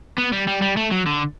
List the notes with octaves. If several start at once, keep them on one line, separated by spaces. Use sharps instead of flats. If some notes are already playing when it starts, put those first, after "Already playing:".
B3
G3
G3
G3
A3
F#3
D3